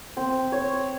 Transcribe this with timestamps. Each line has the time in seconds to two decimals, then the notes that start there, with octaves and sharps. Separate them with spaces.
0.17 C4
0.52 C#5